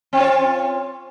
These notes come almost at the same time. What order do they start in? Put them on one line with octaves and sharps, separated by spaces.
C4 F4 C#5